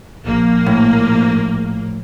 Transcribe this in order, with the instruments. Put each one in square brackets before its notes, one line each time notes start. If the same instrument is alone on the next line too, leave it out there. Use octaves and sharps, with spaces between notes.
[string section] A#1 A#3
[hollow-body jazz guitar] A2